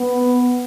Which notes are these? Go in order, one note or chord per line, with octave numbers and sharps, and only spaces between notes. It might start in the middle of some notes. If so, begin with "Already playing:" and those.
Already playing: B3